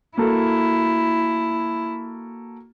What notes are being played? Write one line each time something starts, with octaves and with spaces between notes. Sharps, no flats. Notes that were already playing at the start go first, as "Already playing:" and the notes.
A#3 E4 F#4 A4